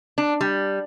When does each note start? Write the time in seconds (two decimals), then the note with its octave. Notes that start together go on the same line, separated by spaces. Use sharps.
0.18 D4
0.41 G3